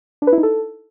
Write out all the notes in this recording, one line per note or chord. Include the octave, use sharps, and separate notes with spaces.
D4
B4
E4
D#4
A4